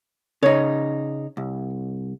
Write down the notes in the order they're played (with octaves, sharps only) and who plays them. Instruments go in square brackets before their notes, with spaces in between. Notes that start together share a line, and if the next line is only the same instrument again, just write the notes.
[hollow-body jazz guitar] C#3 D#4 [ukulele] C#5
[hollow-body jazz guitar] C2